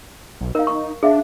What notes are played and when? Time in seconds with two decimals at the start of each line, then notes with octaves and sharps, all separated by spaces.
0.41 B1
0.55 D#4 A#4 F5
0.67 C#6
1.03 D4 G#4 E5 F5